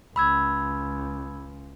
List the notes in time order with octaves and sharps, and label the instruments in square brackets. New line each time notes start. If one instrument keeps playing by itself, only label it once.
[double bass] C#2 [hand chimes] B5 E6 G#6